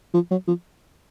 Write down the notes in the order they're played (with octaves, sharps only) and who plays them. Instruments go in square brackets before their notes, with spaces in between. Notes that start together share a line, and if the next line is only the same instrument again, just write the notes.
[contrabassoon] F3
F#3
F3